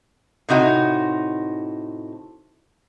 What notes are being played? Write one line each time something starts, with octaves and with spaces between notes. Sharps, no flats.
A2 C3 D#4 F#4